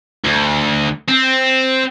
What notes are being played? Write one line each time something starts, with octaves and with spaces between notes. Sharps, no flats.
D2
C4